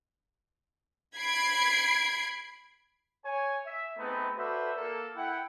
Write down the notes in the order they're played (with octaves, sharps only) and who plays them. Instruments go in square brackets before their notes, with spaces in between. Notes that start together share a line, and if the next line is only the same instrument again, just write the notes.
[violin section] B5 G#6 C7 D7
[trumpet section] C#5 G#5
E5
A3 B3 C4 D#4 G#4 B4
F#4 A4 B4 C5 D5 E5
A#3 A4
E4 F#5 G5